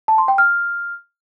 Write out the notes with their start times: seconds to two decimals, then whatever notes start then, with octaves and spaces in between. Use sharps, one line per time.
0.08 A5
0.18 C6
0.28 G5
0.38 F6